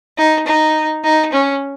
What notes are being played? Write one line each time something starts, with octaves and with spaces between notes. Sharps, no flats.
D#4
D#4
D#4
C#4